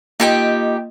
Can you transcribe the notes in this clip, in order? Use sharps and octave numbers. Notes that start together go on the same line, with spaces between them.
A#3 D#4 F4 G4 D#5 G5